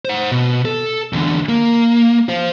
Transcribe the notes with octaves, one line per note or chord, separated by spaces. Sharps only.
C5 F#5
B2
A4
E2 D3
A#3
C5 F5